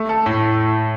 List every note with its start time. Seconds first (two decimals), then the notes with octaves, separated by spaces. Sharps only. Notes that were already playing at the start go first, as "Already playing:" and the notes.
Already playing: A3
0.09 A4
0.26 A2